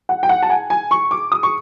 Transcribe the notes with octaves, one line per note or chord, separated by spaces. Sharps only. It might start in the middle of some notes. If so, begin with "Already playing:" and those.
F#5
G5
F#5
A5
G#5
G#5
C#6
D6
D#6
C#6